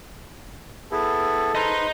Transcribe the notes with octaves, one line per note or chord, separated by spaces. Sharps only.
B3 E4 G#4 A4
B4 C5 D#5 A#5